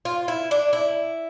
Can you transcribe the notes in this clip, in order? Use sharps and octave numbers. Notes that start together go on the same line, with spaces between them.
F4
E4
D4
E4